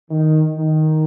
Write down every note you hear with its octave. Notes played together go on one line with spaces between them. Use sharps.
D#3
D#3